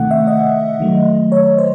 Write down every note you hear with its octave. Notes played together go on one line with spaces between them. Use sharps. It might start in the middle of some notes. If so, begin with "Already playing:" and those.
Already playing: C3 D#3 A3 F#5
E5
D#5
D#3 F#3 A3
C#5
C5